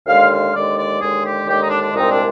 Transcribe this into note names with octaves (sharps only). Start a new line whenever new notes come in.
D#2 D3 G#3 F5
F5
D#2 D3 G#3 D5
D5
D#2 D3 G#3 G#4
G4
D#2 D3 G#3 G4
D#4
D4
D4
C2 A#2 G#3 C4 D#4
D4